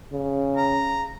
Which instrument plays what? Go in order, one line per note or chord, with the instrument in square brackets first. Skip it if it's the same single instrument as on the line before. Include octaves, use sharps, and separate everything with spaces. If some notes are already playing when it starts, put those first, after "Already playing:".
[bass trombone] C#3
[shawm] A#5